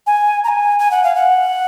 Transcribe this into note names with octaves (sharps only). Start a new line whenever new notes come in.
G#5
A#5
G#5
G#5
F#5
F5
F#5